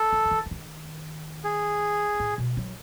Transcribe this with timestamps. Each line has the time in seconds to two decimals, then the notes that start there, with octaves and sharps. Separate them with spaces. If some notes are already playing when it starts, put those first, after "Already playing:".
Already playing: A4
0.13 D#3
0.25 D#3
0.31 E3
0.46 E3
0.51 D#3
1.44 G#4
2.20 A2
2.38 B2
2.57 F#3